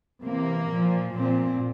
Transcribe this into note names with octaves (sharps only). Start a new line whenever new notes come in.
C3 E3 A#3
A#2 F3
A#2 F3 C4